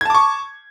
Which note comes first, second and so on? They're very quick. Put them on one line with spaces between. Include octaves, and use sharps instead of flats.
G#6 A5 D6 C#6